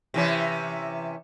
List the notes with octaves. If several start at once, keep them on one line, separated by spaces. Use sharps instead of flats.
C3 E3 C#4